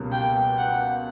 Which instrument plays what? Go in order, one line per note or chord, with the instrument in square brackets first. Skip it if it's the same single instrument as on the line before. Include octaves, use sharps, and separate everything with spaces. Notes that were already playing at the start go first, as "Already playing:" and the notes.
Already playing: [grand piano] C#2 B2 G3 A#3 C#4
[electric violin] G5
F#5